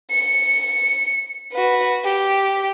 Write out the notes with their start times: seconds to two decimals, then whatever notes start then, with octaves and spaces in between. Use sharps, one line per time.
0.12 C#7
1.53 F#4 B4
2.04 G4